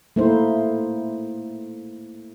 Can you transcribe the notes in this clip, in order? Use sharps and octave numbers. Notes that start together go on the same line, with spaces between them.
A3 A#3 D#4 E4 C5